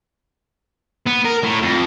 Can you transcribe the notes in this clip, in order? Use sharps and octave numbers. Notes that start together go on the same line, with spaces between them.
B3
A#4
A2
F2